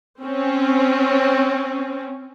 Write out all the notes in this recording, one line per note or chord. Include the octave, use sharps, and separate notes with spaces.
C4 C#4